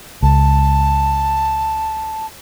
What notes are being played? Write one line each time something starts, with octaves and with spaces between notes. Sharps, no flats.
C#2 A5